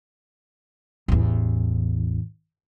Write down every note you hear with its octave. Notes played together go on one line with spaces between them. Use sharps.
A1 E2